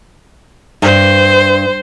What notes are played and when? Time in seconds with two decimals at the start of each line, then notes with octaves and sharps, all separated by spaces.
0.82 G2 C5